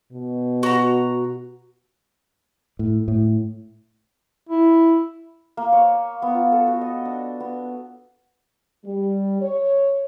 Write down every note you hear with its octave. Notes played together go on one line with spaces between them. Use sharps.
B2
F#4 A#5
A2
A2
E4
A#3
C#5
B3
F4
A4
F#4
D#5
D4
B3
G3
C#5